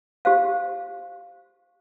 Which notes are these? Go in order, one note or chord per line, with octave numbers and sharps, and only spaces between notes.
G4 C5 F5